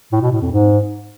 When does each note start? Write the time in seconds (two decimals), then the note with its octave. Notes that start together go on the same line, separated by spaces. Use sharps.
0.12 A2
0.22 B2
0.32 A2
0.42 F2
0.51 G#2